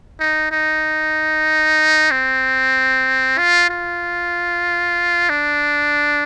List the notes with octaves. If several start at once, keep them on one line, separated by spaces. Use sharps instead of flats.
D#4
D#4
C4
F4
F4
D4